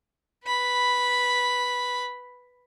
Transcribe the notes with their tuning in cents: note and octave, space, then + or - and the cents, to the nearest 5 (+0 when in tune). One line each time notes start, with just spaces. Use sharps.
B4 +0 B5 +0